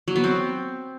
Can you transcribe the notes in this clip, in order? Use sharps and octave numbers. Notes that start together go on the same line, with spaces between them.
F#3
B3
C4